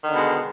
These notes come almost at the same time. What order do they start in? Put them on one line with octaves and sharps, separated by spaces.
D#3 D3 B2 G#3